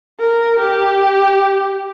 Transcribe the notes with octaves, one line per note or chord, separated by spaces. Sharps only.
A#4
G4